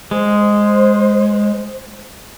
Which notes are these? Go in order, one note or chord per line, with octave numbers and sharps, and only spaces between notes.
G#3 C5